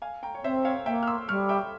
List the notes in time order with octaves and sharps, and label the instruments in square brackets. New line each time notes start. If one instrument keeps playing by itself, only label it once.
[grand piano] F5 G#5
G5 A#5
C#5
[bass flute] C4 [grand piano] C5 E5
[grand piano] C#5 F5
[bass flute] A#3 [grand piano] E5 G5
[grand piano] F6
C6 E6
[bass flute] G3 [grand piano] C#6 F6
[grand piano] E5 G5